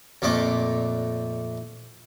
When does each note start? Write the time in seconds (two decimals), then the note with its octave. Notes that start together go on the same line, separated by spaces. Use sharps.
0.22 F2 A#2 A3 D5 D6